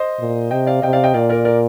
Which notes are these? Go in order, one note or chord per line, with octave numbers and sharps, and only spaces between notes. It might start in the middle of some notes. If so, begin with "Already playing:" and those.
Already playing: C5 D#5
A#2
C3 D#5 G5
D5 F5
C3 D#5 G5
D5 F5
D#5 G5
A#2 D5 F5
A#4 D5
A#4 D5